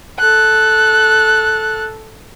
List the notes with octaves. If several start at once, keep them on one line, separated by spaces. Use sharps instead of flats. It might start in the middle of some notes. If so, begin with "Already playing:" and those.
A4 F#6